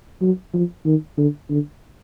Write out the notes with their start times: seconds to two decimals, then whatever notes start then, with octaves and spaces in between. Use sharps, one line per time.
0.22 F#3
0.54 F3
0.85 D#3
1.18 D3
1.50 D3